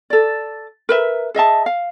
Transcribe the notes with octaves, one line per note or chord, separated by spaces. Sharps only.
A4 D5
A#4 B4 E5
G#4 D#5 E5 A5
F5